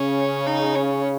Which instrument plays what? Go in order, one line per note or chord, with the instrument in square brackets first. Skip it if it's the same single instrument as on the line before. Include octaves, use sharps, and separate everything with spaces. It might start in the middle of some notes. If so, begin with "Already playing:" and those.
Already playing: [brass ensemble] C#3 [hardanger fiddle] C#4
[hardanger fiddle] D#4
C#4